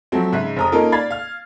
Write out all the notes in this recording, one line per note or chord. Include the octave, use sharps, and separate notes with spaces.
F3 F#3 A3 C4
G#2 C#3 E5 F#6
F1 A#5 D#6
A#3 C#4 D#4 F4 A4 A#4
D5 F5 B5 G#6 A6 C7
F5 F6